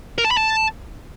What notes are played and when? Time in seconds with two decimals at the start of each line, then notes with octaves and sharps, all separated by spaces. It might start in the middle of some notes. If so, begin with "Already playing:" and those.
0.18 A#4
0.25 A5
0.31 B5
0.37 A5